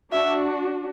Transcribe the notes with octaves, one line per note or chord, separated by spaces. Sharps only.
D4 F#4 E5